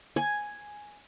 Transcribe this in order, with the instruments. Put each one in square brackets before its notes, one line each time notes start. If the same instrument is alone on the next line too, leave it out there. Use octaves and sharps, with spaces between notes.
[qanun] G#5